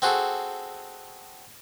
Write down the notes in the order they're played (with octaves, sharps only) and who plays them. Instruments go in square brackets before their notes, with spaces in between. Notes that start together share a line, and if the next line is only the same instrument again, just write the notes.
[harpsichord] C4 F#4 G#4 A4